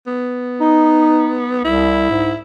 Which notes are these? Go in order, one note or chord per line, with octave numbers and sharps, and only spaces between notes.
B3
D#4
C2 E4
G#2